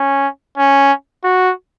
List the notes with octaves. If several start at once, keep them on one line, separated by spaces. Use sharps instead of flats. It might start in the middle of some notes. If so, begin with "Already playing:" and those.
Already playing: C#4
C#4
F#4